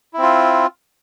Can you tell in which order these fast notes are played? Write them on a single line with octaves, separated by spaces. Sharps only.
E4 C4 F4